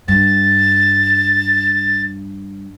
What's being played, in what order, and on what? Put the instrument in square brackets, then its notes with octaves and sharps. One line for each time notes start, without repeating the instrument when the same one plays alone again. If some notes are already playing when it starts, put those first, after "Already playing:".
[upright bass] G2 [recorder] A6